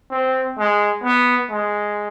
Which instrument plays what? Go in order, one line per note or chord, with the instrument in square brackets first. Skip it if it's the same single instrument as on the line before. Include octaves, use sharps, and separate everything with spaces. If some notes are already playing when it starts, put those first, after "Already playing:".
[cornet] C4
G#3
B3
G#3